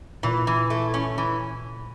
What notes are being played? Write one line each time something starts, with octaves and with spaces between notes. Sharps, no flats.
A#2 E3
E3
A3
C#4
E3